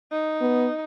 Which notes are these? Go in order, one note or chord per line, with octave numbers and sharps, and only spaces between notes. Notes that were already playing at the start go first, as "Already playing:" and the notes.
D#4
B3